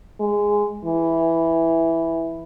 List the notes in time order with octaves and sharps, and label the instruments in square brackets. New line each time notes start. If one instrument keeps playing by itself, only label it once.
[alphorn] G#3
E3